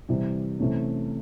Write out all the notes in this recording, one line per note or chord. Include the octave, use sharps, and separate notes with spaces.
C3 E3 G3
C3 E3 A3 C#4